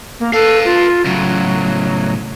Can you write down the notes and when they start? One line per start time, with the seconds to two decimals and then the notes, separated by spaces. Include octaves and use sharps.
0.20 A#3
0.33 A4 B4 F5
0.65 F4
1.05 A2 C#3 F#3